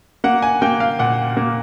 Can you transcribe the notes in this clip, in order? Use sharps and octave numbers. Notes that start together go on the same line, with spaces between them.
A#3 F#5
G#5
A#3 G5
F5
A#2 F#5
A#3